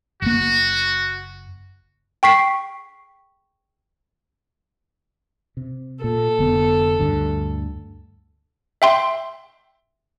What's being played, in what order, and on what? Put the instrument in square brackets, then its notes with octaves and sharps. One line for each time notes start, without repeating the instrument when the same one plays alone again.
[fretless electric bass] F#1 A#3 [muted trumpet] F#4
[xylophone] G5 C#6 B6 C7
[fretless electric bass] C3
[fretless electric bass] A#2 [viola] A4
[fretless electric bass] F1 D3 B3
D2 G2 D3
[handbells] E5 G5 C6